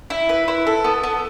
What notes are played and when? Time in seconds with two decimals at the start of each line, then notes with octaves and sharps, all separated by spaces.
0.10 E4
0.29 B4
0.48 E4
0.67 A4
0.84 B3
1.03 B3